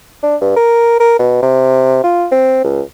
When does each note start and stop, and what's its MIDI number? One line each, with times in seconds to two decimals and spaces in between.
0.23 0.36 62
0.41 0.53 43
0.56 0.95 70
1.00 1.15 70
1.19 1.41 47
1.42 2.03 48
2.04 2.26 65
2.31 2.59 60
2.64 2.81 37